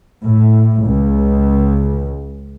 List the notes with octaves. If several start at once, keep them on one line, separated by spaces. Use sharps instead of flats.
A2
C#2